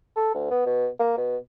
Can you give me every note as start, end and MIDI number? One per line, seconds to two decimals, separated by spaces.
0.16 0.30 69
0.34 0.49 38
0.51 0.65 59
0.66 0.87 47
0.99 1.13 58
1.18 1.37 47